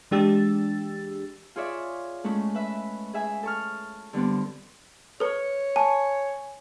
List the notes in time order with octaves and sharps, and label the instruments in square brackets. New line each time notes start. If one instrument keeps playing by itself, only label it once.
[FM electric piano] E3 G#3 D4 G4 E6 A6
[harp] F4 G#4 C#5 D5 E5
G#3 A3 C#4 E4
B4 E5
G#4 E5 G#5
A4 C#6 F6
D3 G3 B3 C4
[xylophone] A4 B4 [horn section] C#5
[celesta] G#5 [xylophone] A5